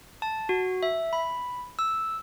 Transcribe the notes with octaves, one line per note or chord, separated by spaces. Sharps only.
A5
F#4
E5
B5
E6